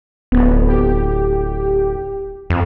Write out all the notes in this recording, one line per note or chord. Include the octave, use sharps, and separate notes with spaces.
D1 B3
G4
F2